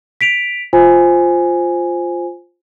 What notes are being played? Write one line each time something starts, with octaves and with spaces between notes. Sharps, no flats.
B6 D7 F7
F4 C5 G#5